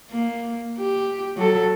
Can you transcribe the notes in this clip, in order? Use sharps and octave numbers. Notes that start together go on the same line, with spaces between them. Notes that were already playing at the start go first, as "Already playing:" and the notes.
A#3
G4
F#3 A4